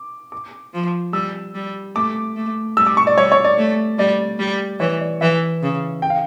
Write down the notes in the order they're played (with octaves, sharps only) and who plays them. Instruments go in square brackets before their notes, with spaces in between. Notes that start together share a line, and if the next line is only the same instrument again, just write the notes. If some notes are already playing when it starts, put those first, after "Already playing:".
Already playing: [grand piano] D6
D6
[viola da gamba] F3
[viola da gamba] G3 [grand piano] E6
[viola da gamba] G3
[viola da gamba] A3 [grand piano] D6
[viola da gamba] A3
[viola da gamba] G3 [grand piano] E6
[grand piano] D6
C#6
D5
[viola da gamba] G3 [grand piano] C#5
[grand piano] C#5
D5
[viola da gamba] A3
[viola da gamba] G3 [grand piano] D5
[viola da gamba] G3
[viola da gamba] E3 [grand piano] C#5
[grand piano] D5
[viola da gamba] E3 [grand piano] E5
[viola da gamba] C#3
[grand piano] G5
F5